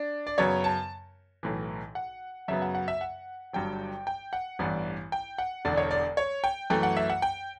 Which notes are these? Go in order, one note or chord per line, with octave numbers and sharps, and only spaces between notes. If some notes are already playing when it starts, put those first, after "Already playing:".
Already playing: D4
D5
F#2 C#3 F#3 B3 C#5
A5
B1 A2 E3
F#5
F#2 C#3 F#3 B3 E5
F#5
F#5
E5
F#5
G1 G2 F#3 G5
G5
F#5
A1 G2 E3 B3 D5
G5
F#5
E1 E2 D3 D5
C#5
D5
C#5
G5
F#2 E3 A3 G5
F#5
E5
F#5
G5